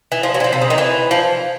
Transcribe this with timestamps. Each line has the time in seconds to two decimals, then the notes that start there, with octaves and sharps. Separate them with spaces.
0.12 E3
0.23 F3
0.34 F#3
0.40 E3
0.44 F3
0.53 C3
0.61 C#3
0.70 D#3
0.78 E3
1.11 F3